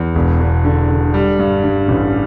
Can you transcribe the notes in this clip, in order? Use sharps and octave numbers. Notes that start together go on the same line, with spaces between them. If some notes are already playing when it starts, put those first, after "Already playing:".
Already playing: E2
E1
E1
D3
D3
G3
G2
G2
A1